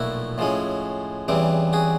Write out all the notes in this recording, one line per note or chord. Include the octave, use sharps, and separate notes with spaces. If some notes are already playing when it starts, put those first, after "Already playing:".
Already playing: B1 A#2 F3 A3 E4 F#4
A2 F3 G#3 C#4
E2 C#3 E3 G3 C4
F#4 G#4